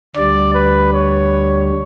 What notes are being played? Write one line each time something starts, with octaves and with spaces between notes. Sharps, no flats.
D2 D3 G3 D5
B4
C#5